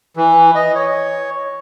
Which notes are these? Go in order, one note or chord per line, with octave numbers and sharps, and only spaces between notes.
E3
D#5
C#5